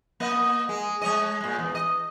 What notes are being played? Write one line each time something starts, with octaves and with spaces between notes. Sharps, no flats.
A#3 D#5
G#3
G#3 C#5 D#5
A#2 G#3
E2
D#5